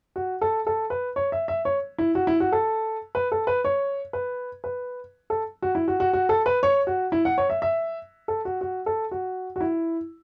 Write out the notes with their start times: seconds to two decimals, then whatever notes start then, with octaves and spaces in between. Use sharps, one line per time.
0.16 F#4
0.41 A4
0.67 A4
0.90 B4
1.16 C#5
1.32 E5
1.48 E5
1.65 C#5
1.98 E4
2.15 F#4
2.27 E4
2.40 F#4
2.52 A4
3.15 B4
3.32 A4
3.47 B4
3.65 C#5
4.13 B4
4.64 B4
5.30 A4
5.62 F#4
5.75 E4
5.88 F#4
6.00 F#4
6.13 F#4
6.29 A4
6.46 B4
6.63 C#5
6.87 F#4
7.12 E4
7.25 F#5
7.38 C#5
7.50 E5
7.62 E5
8.28 A4
8.45 F#4
8.61 F#4
8.86 A4
9.11 F#4
9.56 F#4
9.61 E4